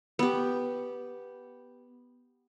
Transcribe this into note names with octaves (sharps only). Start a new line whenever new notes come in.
B3 G4